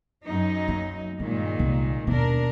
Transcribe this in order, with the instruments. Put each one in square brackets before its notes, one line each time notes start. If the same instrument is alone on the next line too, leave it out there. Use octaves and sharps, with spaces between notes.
[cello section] F#2 F#3 D#4
[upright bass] A#3
[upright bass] G2 [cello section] A#2 D#3 G#3
[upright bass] C2
[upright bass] D#2 B2 [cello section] D4 A#4